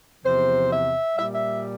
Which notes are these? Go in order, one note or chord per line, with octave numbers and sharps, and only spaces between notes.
E2 C3 F3 C5
E5
A#2 G3 E5
E5